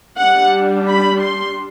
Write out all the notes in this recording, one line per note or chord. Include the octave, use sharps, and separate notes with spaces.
G3 D4 F#5
B5
C6